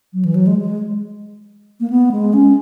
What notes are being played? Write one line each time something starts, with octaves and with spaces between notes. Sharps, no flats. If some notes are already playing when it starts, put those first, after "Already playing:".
F#3
E3
F#3
G#3
G#3
A#3
B3
G#3
C#4